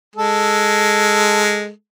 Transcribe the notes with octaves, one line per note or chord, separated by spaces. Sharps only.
G#3 A4